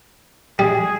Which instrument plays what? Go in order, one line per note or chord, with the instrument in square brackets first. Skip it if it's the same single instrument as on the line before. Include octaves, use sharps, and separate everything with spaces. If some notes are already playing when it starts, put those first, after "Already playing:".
[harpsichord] G3 [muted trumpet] G#4